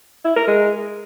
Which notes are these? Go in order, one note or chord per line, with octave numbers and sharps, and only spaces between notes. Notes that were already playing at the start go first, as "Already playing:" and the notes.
E4
A#4
G#3